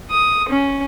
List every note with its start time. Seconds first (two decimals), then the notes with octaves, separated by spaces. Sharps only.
0.11 D#6
0.49 C#4